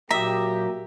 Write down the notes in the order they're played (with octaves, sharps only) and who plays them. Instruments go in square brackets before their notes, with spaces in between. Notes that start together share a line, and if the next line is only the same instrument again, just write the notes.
[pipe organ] A#2 F#3 A#3 [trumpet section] G4 [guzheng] E5 [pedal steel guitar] A#5 D#6